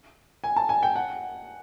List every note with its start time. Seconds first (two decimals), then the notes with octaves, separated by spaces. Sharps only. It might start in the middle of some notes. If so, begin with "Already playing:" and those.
0.44 G#5
0.56 A5
0.69 G#5
0.83 G5
0.95 F#5